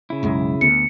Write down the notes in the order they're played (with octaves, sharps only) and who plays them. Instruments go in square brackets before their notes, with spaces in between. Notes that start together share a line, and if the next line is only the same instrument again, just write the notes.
[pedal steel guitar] C#3 E4
[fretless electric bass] B1 F#2 G#3
[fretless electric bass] D2 B3 [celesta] C#7